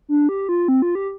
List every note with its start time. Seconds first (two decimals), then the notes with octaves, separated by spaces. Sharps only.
0.09 D4
0.29 G4
0.49 F4
0.68 C4
0.82 F4
0.95 G4